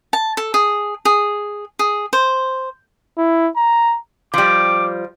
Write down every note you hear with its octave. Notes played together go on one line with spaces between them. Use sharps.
A5
A4
G#4
G#4
G#4
C5
E4
A#5
F3 G3 D6